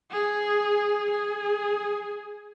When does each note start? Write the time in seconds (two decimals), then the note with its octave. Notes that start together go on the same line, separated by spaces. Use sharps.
0.11 G#4
1.11 G#4